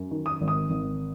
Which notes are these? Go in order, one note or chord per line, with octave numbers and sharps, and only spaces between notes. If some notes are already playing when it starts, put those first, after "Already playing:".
Already playing: F#2
D#3
D#6
G#1
D#6
G#1